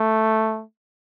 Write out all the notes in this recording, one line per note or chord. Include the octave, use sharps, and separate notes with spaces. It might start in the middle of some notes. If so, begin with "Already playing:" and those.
Already playing: A3